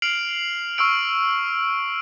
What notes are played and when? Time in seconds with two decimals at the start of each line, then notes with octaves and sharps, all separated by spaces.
0.02 F6 C7 D7 F7 F#7
0.78 C#6 E6 F6 D7